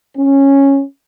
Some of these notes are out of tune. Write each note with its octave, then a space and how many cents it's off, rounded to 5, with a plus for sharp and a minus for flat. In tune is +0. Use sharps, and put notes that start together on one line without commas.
C#4 -10